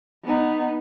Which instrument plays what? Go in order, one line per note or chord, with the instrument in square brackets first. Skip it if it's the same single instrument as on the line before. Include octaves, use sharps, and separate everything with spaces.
[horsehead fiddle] B3 D#4